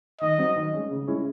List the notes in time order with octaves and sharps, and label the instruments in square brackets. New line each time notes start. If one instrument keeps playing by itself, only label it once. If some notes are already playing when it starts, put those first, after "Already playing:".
[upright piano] D#3 [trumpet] D#5
[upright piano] F#3 C4
D#3
G#3 C#4
C#3
G#3 C#4 E4